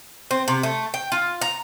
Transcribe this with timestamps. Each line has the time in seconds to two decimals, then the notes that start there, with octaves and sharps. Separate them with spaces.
0.31 C4
0.48 C3
0.63 A3
0.94 G5
1.12 F4
1.41 A#5